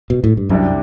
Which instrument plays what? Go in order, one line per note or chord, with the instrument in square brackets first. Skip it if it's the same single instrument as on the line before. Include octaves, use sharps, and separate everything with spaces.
[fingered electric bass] B2
A2
G2
[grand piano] C2 C3 G3 D4 G4 [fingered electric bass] F#2